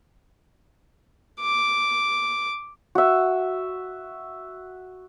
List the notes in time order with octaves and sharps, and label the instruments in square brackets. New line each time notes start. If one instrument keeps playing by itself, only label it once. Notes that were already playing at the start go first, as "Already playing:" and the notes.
[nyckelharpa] D6
[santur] F#4 E5